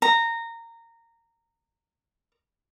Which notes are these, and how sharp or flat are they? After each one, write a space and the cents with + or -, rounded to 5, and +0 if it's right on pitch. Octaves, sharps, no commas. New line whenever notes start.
A#5 -15